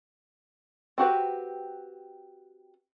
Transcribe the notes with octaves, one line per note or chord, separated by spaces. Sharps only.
C4 F#4 G4 B4